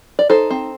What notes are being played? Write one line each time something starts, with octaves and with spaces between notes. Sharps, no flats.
D5
D#4 A4 C5
C4